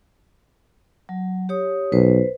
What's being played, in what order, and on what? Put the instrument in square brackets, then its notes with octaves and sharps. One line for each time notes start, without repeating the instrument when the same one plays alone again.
[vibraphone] F#3
G4 C#5 D#6
[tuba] B1 [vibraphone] B4 C5